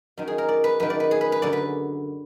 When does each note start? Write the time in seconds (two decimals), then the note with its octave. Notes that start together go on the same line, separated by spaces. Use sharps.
0.17 F#2 D#3
0.28 G#4
0.38 A#4
0.49 D5
0.64 B4
0.80 F#2 D#3 B4
0.90 D5
1.00 B4
1.11 G#4
1.21 B4
1.32 B4
1.42 F#2 D3 D5
1.53 B4